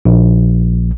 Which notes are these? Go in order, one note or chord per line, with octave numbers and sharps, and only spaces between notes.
A#1